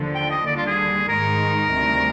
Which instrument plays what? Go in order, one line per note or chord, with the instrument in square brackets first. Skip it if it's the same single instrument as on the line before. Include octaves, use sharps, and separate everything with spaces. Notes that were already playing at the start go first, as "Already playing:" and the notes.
Already playing: [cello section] D#2 D3 F3
[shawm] G5
D#5
[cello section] D#2 D3 G3 [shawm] D5
[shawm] F4
G#4
[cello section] G#2 D#3 G#3 D#4 [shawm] A#4
[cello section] D2 C3 D#3 G3